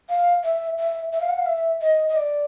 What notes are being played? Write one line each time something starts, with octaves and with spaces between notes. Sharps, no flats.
F5
E5
E5
E5
F5
F#5
F5
E5
D#5
D#5
D5